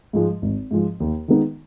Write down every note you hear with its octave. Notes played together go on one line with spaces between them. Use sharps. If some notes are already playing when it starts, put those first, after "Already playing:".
G#2 F3 G#3
G#1
G#2 F3 G#3
D#2
D#3 G#3 B3 D#4